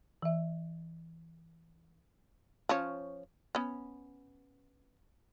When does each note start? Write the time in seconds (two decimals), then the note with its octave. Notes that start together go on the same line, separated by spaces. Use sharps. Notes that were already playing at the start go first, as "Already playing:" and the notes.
0.22 E3 E5
2.69 F3 C#4 C#5
3.55 B3 C#4